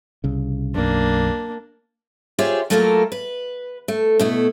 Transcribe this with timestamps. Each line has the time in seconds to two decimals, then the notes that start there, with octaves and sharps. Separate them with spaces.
0.24 C2 C#3
0.75 B1 F#2 A#3 D4
2.39 F4 G4 G#4 C5 C#5 E5
2.70 F#3 A3 A#3 F4 A4 A#4
3.12 B4
3.88 A3
4.19 B2 A3 E4